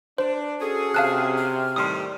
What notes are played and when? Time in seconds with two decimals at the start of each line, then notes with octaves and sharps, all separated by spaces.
0.18 D4 C5
0.60 C#4 F#4 G#4 A4
0.94 C3 F5 A5 F6 F#6
1.37 F6
1.76 A2 D#3 G3 C6 D#6